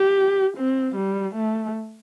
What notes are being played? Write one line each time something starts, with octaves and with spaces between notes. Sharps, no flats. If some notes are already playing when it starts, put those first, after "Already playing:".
Already playing: G4
C4
G3
A3